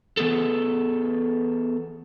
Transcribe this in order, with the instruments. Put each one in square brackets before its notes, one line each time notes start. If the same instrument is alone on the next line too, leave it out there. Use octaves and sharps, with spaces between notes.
[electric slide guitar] E3 B3 G#4 A4